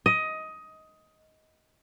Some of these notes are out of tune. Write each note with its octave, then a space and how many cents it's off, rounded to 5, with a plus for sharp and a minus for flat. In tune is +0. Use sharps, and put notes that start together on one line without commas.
D#5 +15